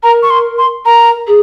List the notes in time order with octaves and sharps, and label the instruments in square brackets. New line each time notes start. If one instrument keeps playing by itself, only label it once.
[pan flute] A#4 [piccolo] A#5
[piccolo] C#6
C6
C6
[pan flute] A#4 [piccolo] A#5
[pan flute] G#4